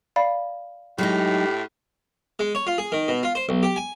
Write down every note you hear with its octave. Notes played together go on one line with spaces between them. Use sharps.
D5 F5 B5
A2 F#3 G#3 D#4 G4
G#3
C#5
F4
G#4
D#3
B2
F4
C5
B1
G4
G#5